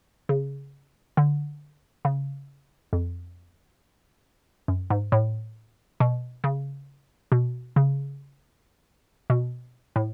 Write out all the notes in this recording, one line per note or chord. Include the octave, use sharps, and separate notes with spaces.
C#3
D3
C#3
F2
F#2
G#2
A2
B2
C#3
B2
C#3
B2
A2